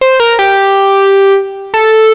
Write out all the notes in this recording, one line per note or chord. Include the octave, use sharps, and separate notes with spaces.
C5
A#4
G4
A4